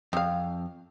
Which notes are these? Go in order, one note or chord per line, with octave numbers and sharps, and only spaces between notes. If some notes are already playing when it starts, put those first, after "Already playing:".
F2 C4 F5